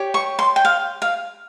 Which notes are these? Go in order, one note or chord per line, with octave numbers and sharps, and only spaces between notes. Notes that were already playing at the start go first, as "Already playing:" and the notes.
Already playing: G4 C#5
C#6
C6
G5
F5
F5